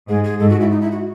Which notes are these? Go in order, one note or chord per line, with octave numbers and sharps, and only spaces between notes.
G#2 G#4
G#4
G#2 A4
F#4
E4
D#4
E4
F#4